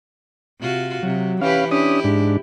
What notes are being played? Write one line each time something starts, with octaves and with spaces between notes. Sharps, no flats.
C3 F4 F#4
C3 F#3
E3 C#4 G4 B4 F5
C#4 D4 E4 G4 D#6
G#2 D4